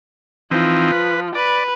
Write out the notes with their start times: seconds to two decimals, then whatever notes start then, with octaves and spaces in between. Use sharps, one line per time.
0.51 E3 F3 C4 D#4
0.92 B4
1.35 B4 D5